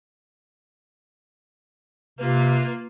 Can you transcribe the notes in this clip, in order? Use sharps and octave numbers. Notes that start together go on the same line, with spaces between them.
C3 A#3 F4 B4